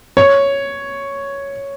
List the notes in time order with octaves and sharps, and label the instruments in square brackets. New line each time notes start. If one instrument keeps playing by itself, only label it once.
[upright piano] C#5